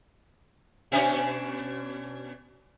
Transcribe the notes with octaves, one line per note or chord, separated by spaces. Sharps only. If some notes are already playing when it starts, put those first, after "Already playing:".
B2 C#4 D4